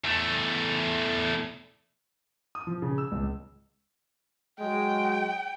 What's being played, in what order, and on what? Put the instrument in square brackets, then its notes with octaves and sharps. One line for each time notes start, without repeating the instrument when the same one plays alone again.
[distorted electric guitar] E2 A3
[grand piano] D#6
F3
C#3
E6
C#2
[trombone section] F#3 G#3 [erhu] G5